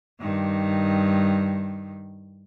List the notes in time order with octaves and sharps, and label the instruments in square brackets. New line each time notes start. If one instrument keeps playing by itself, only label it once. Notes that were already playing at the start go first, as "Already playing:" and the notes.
[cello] G2 D#3